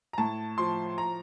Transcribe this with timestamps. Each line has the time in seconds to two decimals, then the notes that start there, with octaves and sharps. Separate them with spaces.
0.13 A#5
0.18 A2 A5
0.58 F3 C6
0.98 A#5